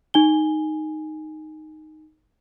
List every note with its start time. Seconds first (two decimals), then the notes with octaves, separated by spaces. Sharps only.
0.14 D#4 G#5 G7